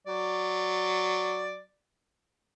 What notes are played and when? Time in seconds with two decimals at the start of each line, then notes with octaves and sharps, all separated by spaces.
0.07 F#3 D5